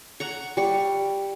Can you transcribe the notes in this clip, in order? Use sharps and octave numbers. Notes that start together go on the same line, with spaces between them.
F#5 A#5 C#6
G3 C#6